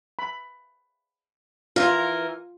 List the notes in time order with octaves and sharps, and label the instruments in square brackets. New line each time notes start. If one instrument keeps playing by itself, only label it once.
[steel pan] B5
[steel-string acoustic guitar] E3 A#4 [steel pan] F4